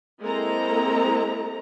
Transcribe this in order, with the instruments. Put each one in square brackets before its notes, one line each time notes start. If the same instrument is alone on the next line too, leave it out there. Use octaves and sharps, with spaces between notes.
[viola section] G#3 A#3 C4 E4 A4 A#5